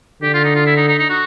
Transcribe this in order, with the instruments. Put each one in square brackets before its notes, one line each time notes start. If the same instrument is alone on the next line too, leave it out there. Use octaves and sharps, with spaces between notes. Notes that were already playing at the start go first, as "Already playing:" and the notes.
[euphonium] D3 [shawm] G4
[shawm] F4
D#4
F4
E4
D#4
D#4
D#4
F#4